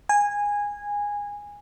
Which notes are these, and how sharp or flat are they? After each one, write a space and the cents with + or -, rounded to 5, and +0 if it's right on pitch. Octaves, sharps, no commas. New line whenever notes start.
G#5 -15